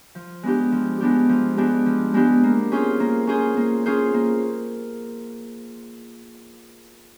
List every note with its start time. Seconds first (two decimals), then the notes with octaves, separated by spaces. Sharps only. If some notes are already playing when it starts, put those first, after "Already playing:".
0.15 F3
0.43 G#3 B3 D4 G4
0.72 F3
1.00 G#3 B3 D4 G4
1.29 F3
1.57 G#3 B3 D4 G4
1.86 F3
2.14 G#3 B3 D4 G4
2.44 A#3
2.72 C#4 F4 G#4 C5
3.00 A#3
3.27 C#4 F4 G#4 C5
3.57 A#3
3.86 C#4 F4 G#4 C5
4.14 A#3